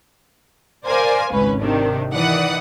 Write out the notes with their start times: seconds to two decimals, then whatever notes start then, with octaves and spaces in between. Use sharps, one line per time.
0.86 A#4 C5 D5 F5 G#5
1.32 G#1 C#2 C#4 B4
1.62 C3 D#3 D4
2.12 D#3 E3 D5 F#5 D#6